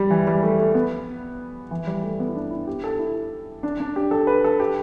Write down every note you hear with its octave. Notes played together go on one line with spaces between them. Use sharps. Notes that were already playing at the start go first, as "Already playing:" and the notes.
Already playing: G3
E3
G3
A3
A3
B3
E3
G3
A3
B3
E4
D4
E4
G4
A4
E4
D4
D4
G4
A4
B4
A4
G4